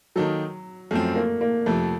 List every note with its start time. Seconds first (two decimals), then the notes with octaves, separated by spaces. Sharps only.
0.16 D#3 F#3 A#3 D#4 A4
0.91 F#2 F3 A3 C4
1.16 A#3
1.41 A#3
1.66 F2 C3 F3 A3